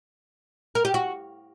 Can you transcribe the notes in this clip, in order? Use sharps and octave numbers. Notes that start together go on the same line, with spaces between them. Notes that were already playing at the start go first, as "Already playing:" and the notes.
A#4
G4
F#4